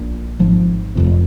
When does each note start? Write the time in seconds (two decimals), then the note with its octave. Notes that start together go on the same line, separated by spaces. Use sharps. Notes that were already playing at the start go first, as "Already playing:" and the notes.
Already playing: A#1 A#2
0.39 G#1 G#2 F3
0.95 F1 F2 C3